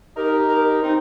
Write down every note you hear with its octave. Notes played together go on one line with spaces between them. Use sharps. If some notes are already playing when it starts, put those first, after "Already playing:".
D#4 G4 A#4
A#4
C4 D#4